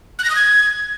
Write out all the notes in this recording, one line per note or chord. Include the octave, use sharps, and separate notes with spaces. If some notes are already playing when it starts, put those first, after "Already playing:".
F#6
A#6
D#6
G#6